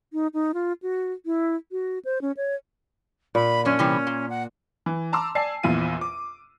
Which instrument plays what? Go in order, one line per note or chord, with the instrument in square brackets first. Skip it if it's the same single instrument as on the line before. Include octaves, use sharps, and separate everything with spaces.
[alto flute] D#4
D#4
F4
F#4
E4
F#4
C5
C#4
C#5
[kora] A#2 [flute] B5
[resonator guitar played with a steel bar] F#2 D4 [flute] C#4
[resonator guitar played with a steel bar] C3 E3 G3
A#2
[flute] F#5
[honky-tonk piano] E3
A5 A#5 C6 D6 E6
D5 G#5 A5 C7
A#1 E2 A#2 E4 F4 D#7
D6